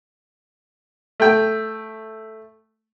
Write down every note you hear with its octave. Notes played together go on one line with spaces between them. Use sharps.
A3 G5